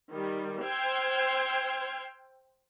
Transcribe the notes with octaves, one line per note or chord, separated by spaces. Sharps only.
D#3 G3
C5 G5 E6 F6 G#6 C7